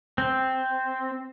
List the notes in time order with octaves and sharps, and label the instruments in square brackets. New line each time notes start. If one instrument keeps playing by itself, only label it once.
[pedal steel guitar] C4